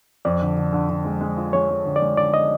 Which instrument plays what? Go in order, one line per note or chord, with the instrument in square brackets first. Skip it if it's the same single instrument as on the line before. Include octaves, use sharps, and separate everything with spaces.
[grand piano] F2 [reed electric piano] D5
[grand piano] D3
D3
D3
D3
G#3
G#3
F3
[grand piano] G#3 [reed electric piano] C#5
[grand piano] G#3
D3
[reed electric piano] D5
[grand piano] G#3
[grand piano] D3 [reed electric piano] D5
[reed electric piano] D#5